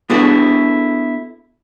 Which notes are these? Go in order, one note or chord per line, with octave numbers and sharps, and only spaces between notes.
B3 D4 E4 F#4 G#4 A4